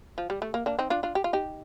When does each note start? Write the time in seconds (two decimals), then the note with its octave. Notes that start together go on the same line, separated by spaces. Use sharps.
0.18 F3
0.30 G3
0.42 A3
0.54 A#3
0.66 A#3 D4
0.79 C4 D#4
0.90 D4 F4
1.03 D4 F4
1.15 G4
1.24 F4
1.33 D#4 G4